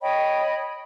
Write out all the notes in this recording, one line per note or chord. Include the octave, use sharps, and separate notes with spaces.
C#5 D#5 G5 B5